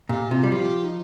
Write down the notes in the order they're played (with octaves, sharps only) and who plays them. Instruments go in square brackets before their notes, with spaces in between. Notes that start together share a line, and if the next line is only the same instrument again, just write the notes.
[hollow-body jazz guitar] A#2 [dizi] G4
[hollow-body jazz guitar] C3 [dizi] F4
[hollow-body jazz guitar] G3
[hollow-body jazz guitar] F3 [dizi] G4
[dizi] D#4